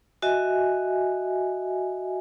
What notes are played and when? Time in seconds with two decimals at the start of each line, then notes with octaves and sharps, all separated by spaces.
0.22 F#4 D#5 E5 G#5